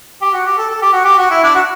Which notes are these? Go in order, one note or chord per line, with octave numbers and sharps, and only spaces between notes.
G4
F#4
G4
A4
A4
G4
F#4
G4
F#4
E4
D4
F#4